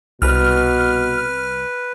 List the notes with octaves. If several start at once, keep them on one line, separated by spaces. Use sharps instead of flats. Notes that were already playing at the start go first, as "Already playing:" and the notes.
C2 B2 B4 F6